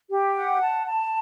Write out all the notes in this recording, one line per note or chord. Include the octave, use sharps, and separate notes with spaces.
G4
F#5
A5
A5